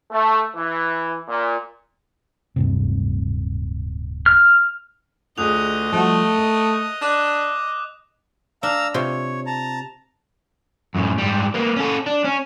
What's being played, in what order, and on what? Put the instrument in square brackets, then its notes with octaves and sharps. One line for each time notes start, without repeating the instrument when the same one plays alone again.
[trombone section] A3
E3
A#2
[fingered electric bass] D1 G2 C3
[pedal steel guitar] F6
[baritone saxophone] D2 [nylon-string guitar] F4 G#4 [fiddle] D#5 [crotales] D#6 F#6 F7
[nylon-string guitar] F3 G3 F#4 [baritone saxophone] A3
[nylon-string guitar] A#4
[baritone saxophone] D4 [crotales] D6 F#6
[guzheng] D4 [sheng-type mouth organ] F5 A#5 E6
[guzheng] C3 F4 [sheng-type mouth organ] C#5
[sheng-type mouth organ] A5 A#5
[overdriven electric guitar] F#2 A2
G#2 G3
A#3 B3
C#4 A4
D4
C#4